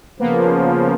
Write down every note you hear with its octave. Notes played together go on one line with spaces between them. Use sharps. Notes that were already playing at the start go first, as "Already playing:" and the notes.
C#3 F3 A#3 B3